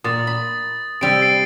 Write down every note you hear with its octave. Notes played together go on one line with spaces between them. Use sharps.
A#2 D#6 A6
B5
C3 G3 E6 A6 D7
C7 D7